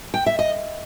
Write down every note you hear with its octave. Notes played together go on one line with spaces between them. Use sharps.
G5
E5
D#5